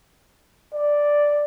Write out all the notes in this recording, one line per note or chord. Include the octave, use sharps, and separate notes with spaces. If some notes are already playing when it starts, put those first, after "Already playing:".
D5